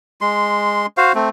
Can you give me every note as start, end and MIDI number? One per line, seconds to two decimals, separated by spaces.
0.21 0.86 56
0.21 0.86 84
0.97 1.12 66
0.97 1.12 72
0.97 1.12 77
1.15 1.29 57
1.15 1.29 60